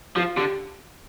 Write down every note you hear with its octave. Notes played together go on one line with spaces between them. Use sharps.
F3 F4
D3 G4